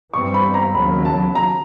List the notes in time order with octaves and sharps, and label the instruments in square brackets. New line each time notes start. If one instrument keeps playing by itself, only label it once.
[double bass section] G2 E3 G3 C4 [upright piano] C#6
[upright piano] B5
A#5
[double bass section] D#2 C#3 F#3 [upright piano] B5
[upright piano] A5
A#5